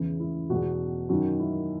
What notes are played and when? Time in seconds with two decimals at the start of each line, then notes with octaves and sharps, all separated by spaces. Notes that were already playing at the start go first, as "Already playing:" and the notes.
Already playing: E2 C#3 E3
0.20 E4
0.50 E2 B2 F#4
1.09 F#2 D#3 F#4
1.39 E4